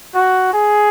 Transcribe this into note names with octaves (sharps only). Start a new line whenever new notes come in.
F#4
G#4